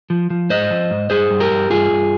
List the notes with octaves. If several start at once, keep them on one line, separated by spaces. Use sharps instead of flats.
F3
F3
G#2 C5 D#5
F3
G#2
G2 G#4 C5
G2
G4 A#4
G2
G2 F4 G#4
G2